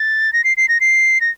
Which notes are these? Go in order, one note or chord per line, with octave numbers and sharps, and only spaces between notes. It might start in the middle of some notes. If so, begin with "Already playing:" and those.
Already playing: A6
A#6
C7
C7
A#6
C7
A#6